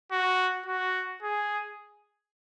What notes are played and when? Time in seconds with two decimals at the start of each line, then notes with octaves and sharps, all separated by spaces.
0.12 F#4
0.66 F#4
1.22 G#4